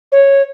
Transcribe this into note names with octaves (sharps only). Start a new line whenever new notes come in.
C#5